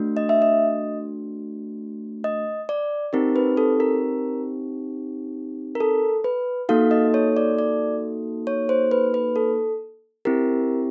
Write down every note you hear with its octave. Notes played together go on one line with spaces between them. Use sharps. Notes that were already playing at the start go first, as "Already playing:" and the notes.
Already playing: A3 D4 F#4
D#5
E5
D#5
D#5
D5
C4 D#4 G4 A#4
B4
A4
A#4
A#4
A4
B4
A#3 D#4 F#4 A4 F5
D#5
C#5
D5
D5
C#5
C5
B4
B4
A4
C4 E4 G4 A#4